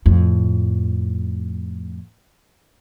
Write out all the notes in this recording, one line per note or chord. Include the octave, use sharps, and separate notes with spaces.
F2 A2